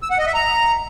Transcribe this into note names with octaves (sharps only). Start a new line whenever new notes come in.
E6
F#5
D#5
E5
A#5